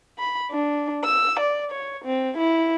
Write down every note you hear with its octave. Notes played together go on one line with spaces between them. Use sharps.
B5
D4
E6
D5
C#5
C4
E4